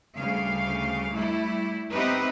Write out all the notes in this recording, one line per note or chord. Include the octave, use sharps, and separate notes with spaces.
D2 C#3 G3 F5
G3 A3 E4
B3 C4 D#4 G4 B4 E5